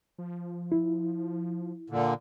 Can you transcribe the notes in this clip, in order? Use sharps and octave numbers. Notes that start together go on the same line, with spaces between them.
F3
E4
A#2 D3